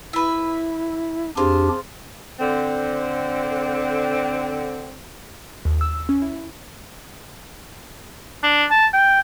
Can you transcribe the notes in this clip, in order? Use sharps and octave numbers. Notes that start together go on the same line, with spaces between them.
E4 B4 E5
F2 D4 F4 G4 G#4 C5
D3 C4
D#2
E6
C#4
E4
D4
A5
G5